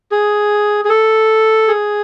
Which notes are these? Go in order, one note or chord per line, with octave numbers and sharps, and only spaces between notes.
G#4
G#4
A4
G#4